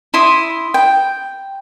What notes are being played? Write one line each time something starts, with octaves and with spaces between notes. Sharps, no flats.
E4 C6 D#6
G5